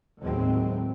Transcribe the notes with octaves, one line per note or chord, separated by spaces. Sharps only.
D#2 A2 F#3 G#3 C4